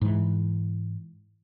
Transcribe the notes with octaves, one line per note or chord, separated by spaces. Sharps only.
G#2 E3